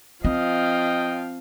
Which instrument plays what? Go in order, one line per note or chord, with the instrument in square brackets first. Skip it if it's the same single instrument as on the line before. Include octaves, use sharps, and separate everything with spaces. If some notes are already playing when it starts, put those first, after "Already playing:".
[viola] F3 F5 [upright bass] C4 [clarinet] D#5 [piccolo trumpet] G5